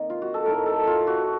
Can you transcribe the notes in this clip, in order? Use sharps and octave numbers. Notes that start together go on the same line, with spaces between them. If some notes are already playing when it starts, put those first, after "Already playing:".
Already playing: D#3 A#3 C4 D#4
F4
F#4
A4
A2 A3 D#4 A#4
A4
F4
F#4